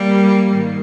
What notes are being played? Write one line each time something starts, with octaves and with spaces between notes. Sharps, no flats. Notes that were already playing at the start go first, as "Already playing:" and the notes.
Already playing: G3 A#3
G#2 D#3 G3